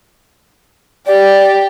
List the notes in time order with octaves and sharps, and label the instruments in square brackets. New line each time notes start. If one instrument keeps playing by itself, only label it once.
[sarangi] G4 [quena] D5